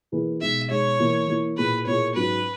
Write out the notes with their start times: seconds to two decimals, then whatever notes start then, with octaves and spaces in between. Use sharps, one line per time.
0.12 E3 A#3 E4 G#4 B4
0.41 B2 G#3 D#4 G#4 E5
0.70 B2 G#3 D#4 G#4 C#5
0.99 E3 A#3 E4
1.28 E3 A#3 E4
1.58 A#2 A#3 E4 G#4 B4
1.87 A#2 A#3 E4 G#4 C#5
2.15 G#2 F#3 C#4 B4